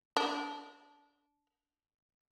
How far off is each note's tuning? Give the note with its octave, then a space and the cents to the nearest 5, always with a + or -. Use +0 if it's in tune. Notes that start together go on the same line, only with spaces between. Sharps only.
D4 -20